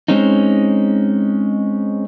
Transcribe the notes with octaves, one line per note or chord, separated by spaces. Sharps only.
G#3 C4 C#4 D#4